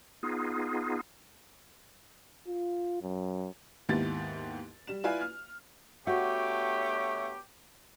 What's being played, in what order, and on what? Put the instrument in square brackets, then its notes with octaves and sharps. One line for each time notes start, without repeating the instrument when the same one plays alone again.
[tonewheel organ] B3 D#4 F4 G#4
[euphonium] F4
F#2
[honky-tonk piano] D#2 G#2 B3 E4 G4 A6
G3 E7
E4 F4 B4 D5 F5 G#5
F6
[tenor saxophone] A3 [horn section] B3 D4 G4 [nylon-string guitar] F#4 [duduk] C#5